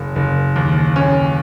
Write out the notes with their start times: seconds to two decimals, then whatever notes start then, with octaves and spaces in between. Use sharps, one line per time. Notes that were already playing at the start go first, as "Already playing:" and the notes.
Already playing: F#1
0.16 F#1
0.56 D#2
0.96 C#4